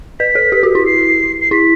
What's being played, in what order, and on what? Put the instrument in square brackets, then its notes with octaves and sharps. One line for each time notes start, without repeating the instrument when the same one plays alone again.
[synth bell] B4 [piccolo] B6
[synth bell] A4
G4
F#4
[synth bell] E4 [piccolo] B6
[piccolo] C7
C7
[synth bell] E4 [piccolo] B6